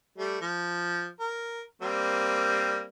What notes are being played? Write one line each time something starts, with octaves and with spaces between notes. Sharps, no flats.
G3 A3
F3
A#4
G3 A#3 C4